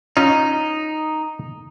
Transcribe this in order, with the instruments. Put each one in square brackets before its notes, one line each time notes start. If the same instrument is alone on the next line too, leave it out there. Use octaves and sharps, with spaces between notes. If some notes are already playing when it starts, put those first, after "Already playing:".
[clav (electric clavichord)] C#4 F4 [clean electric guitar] D#4